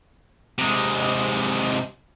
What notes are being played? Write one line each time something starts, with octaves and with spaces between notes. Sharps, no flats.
C3 G#3